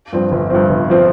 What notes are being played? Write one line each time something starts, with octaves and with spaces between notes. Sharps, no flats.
G2 F3 C4
G1
G2 F3 C4
G1
F3 C4